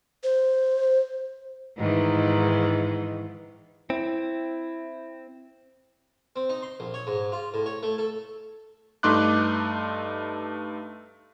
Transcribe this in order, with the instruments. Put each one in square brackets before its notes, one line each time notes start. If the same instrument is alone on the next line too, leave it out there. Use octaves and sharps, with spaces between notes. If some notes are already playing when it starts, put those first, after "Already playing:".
[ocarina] C5
[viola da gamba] G#2 D#3 E3
[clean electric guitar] C4 [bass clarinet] E4
[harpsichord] C4
D#4
C6
A#1
C#5
G#2
F4
A2
C#5
A3
A4
[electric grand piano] G2 A3 D#4 C6 D6 F#6